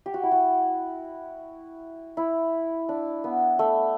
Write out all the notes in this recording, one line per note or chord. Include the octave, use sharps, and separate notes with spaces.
G4
F#4
E4
F#4
E4
D4
B3
A3